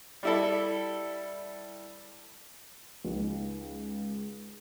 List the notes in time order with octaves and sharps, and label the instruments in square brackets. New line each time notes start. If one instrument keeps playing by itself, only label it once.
[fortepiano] G3 E4 A4
[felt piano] C#2 D#4